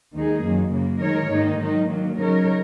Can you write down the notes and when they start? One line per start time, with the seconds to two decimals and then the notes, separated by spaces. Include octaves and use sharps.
0.14 D#2 D#3 G#3 D#4 G#4
0.43 F#2 D#3 F#3 A#3
0.72 F#2 C#3 A#3
1.01 D#3 G#3 D#4 A#4 C#5
1.31 G#2 D#3 A#3 D#4
1.60 D#3 F#3 D#4
1.89 D#3 F#3 A#3
2.18 C#3 F#3 D#4 A#4 C#5